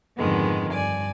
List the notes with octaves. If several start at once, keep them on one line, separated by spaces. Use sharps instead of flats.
F2 G#2 D3 D#3 G#3 B3
G2 D5 G#5